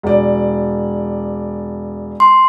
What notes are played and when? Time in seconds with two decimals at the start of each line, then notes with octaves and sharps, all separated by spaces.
0.03 E1 D5
2.20 C6